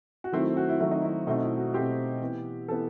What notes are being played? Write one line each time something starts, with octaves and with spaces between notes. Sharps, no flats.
F#4
D#3 F#3 A3 C4 E4
E4
F#4
E4
D#3 F#3 A3 C4 E4
D#4
E4
B2 A3 C4 D#4
E4
F#4
B2 A3 C4 G4
E3 B3
E3 B3 A4